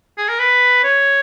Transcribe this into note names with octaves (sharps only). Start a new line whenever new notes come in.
G#4
A#4
B4
C#5